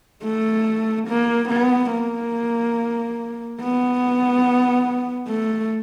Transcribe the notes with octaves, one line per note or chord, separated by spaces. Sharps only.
A3
A#3
B3
A#3
B3
A3